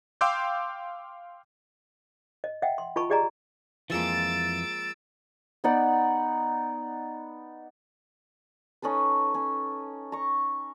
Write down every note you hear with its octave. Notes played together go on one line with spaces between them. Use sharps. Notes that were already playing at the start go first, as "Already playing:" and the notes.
F5 G5 C6 D6 E6 G6
D#5
D#5 E5 F#5 G5
C6
F4 D#5 G#5 A5 B5 C#6
G4 G#4 D5 D#5 G#5 A#5
F2 E3 F3 G#3 A#3 E6 A6 D7
B3 D#4 D5 F#5
C#4 D#4 A4 B4
C#4
A#5 C#6